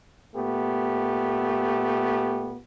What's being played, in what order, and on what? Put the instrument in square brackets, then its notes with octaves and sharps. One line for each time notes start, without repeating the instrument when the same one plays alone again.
[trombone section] A#2 A3 B3 G4